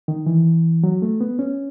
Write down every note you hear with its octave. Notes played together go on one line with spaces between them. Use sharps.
D#3
E3
F#3
A3
B3
C#4